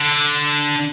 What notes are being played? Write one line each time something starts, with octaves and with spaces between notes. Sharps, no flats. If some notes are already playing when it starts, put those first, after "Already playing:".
Already playing: D3